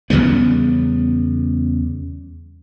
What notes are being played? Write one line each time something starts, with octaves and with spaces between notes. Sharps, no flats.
E2 C#3 G3 B3